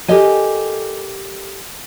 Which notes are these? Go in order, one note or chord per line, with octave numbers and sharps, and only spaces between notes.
G4 A4 A#4 D#5 G#5